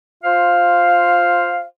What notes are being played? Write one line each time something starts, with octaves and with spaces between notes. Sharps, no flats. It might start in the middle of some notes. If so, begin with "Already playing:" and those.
F4 C5 F5